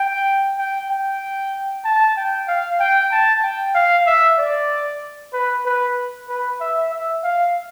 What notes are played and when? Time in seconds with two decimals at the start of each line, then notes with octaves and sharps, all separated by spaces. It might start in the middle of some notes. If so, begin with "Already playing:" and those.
Already playing: G5
0.58 G5
0.89 G5
1.85 A5
2.17 G5
2.48 F5
2.80 G5
3.11 A5
3.43 G5
3.75 F5
4.07 E5
4.38 D5
5.33 B4
5.65 B4
6.28 B4
6.60 E5
6.92 E5
7.23 F5